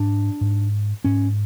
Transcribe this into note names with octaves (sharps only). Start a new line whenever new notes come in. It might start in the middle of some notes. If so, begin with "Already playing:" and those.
Already playing: G#2 D4
G#2
G#2 C#4